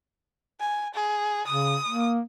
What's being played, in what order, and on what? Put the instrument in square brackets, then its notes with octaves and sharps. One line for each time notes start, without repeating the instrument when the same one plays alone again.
[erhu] G#5
G#4
[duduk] C#3 [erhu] D#6
[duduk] A#3